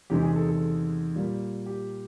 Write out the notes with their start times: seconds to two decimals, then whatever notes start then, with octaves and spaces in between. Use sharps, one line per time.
0.10 E2 C3 D#3 G#3 G4
0.23 G#4
0.36 A4
0.49 A4
1.15 A#2 G3 A#3
1.66 G4